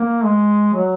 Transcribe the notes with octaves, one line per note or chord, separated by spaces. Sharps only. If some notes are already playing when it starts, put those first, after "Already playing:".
Already playing: A#3
G#3
F#3